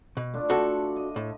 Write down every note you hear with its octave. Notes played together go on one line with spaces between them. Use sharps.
B2
A3 D4 F4
F#4 A4
D#5
A2